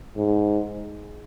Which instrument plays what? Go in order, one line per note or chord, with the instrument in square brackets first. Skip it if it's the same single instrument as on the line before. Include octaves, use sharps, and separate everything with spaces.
[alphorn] G#2